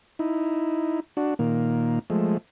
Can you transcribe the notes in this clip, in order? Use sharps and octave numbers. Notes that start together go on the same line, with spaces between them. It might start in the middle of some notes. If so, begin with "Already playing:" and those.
D#4 E4
D4 F#4
A#2 D#3 A#3
F3 G#3 A3